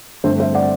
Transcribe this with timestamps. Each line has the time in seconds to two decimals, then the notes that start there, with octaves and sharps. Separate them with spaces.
0.24 G2 D3 A3 C4 A4 C5
0.39 C5 E5
0.54 D5 F#5